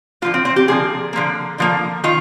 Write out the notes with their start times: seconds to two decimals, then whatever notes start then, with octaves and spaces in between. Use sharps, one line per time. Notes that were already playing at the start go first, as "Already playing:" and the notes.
0.22 D3 F3 A#3 F4
0.34 C4
0.45 C4
0.56 G4
0.68 D3 F3 A#3 G#4
1.13 D3 F3 A#3
1.58 D3 F3 A#3
2.04 D#3 F4